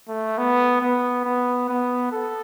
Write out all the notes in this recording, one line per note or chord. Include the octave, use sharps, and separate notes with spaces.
A3
B3
B3
B3
B3
A4